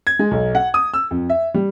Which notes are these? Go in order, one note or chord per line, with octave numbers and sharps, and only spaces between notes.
G#6
G#3
B1
F#5
D#6
E6
F2
E5
G3